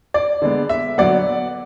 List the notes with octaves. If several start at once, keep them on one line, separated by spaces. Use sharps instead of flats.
D5
D3 G#3 B3
E5
D3 F#3 B3 D5 F#5